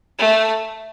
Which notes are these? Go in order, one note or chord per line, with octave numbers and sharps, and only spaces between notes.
A3